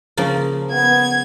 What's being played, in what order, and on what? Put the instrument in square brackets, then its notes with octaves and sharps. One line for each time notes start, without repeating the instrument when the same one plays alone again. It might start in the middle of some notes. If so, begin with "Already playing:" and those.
[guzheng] C#3 F3 A#3
[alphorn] B3 [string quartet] G#6